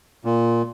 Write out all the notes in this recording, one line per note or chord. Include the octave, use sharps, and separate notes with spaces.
A#2